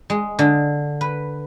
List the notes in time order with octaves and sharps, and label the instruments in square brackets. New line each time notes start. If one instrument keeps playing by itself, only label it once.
[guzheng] G#3
D3
B4